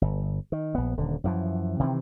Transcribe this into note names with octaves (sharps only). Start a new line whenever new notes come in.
G1
D#3
A#1 B3
D#1 D3
F#2 E3 F3
C3 D#3 E3 C4